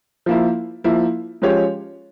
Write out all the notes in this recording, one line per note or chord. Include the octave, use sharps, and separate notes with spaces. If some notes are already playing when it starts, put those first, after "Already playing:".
F3 A#3 E4
F3 A#3 E4
F3 G#3 C#4 G4 C#5